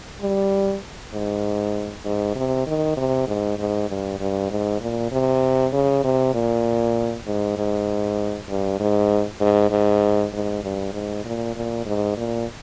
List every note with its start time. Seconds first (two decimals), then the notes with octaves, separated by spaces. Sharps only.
0.22 G3
1.13 G#2
2.05 G#2
2.35 C3
2.67 D#3
2.97 C3
3.27 G#2
3.58 G#2
3.89 G2
4.20 G2
4.51 G#2
4.81 A#2
5.12 C3
5.73 C#3
6.04 C3
6.34 A#2
7.26 G#2
7.57 G#2
8.49 G2
8.80 G#2
9.41 G#2
9.71 G#2
10.33 G#2
10.63 G2
10.93 G#2
11.25 A#2
11.56 A#2
11.86 G#2
12.17 A#2